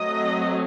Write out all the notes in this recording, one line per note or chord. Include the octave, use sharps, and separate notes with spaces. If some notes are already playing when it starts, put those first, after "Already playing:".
Already playing: F#3 A3 C4 D#5